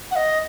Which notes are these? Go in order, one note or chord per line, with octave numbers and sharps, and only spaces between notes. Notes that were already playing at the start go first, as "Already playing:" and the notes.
F#5
D#5